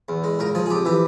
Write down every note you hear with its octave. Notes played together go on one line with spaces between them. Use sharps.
E2
G#3
C#2 A#4
F3 G#4
G#4
F2 G4
E3 G4